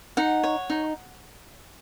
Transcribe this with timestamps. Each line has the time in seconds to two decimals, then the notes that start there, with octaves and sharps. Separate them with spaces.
0.17 D#4 F#5
0.43 C#5
0.70 D#4